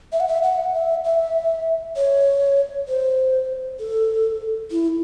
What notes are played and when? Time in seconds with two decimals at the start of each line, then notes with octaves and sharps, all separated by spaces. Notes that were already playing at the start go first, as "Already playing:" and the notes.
0.12 E5
0.20 F#5
0.28 E5
0.43 F#5
0.74 E5
1.04 E5
1.96 C#5
2.88 C5
3.80 A4
4.71 E4